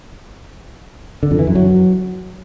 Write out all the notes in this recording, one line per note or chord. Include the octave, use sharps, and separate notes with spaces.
D3
F2
E3
F#2
F#3